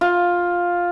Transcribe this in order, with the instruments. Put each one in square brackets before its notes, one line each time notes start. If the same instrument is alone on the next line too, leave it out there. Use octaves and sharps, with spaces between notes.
[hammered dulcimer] F4